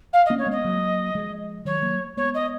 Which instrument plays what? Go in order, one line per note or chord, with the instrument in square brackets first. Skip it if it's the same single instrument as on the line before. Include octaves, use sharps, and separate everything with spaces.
[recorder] F5
D#5
[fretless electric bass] A#3 C#4
[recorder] C#5
[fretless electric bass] G#3 B3 [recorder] D#5
[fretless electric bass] F#3 A#3
F3 G#3
[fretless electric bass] D#3 F#3 [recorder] C#5
[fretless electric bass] F#3 A#3
[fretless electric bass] G#3 B3 [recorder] C#5
[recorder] D#5